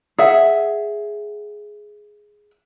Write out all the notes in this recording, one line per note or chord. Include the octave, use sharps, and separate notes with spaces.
G#4 E5 F#5